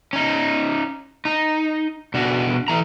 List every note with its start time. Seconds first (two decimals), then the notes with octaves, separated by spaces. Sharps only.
0.13 C#4 D#4
1.25 D#4
2.14 B2 D4 F#4
2.68 E3 A#5